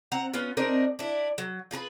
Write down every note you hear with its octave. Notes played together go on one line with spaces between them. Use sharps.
C4 F#5 A#5
B3 C#4 F4
C4 D4 D#4 A#4
D4 E4
F#3
F4 G#4 A#4 B4